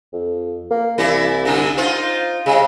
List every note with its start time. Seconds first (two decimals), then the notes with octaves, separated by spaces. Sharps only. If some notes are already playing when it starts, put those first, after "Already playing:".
0.13 F2
0.70 A#3
0.98 C2 E3 E4 D5
1.45 G2 D3 D4
1.77 D#4 F4 C5
2.46 C3 G#3